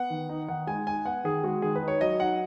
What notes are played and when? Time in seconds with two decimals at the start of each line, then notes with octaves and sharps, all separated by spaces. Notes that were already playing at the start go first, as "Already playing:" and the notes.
Already playing: B3 F#5
0.10 D#3
0.29 D#4
0.48 D#3 F#5
0.67 G#3 G#5
0.87 D#4 G#5
1.06 B3 F#5
1.24 D#3 G#4
1.44 G#3 F#4
1.62 D#3 G#4
1.75 B4
1.82 D#4
1.88 C#5
2.01 F#3 D#5
2.20 D#4 F#5